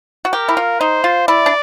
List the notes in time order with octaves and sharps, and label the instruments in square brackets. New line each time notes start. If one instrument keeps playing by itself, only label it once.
[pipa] F#4
[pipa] G4 [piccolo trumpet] A#4
[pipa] E4
F4
[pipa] D#4 [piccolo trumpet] C5
[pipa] F4
[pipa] E4 [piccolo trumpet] D5
[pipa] D4